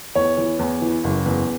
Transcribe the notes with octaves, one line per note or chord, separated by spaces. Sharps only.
E2 C#5
E3
E2
E3
F#1
E2